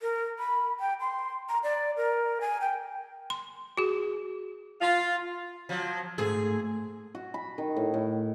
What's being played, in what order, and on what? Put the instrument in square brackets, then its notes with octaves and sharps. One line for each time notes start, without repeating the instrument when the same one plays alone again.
[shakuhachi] A#4
B5
G5
C6
A#5
D5
A#4
G#5
G5
[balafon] C6
F#4 G#4
[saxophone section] F4
[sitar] F3 F#3
[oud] G#2 A3 [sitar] G#4
[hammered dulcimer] F#4
B5
D#3
A2
A2